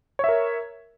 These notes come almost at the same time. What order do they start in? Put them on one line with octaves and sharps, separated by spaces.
C#5 E5 A#4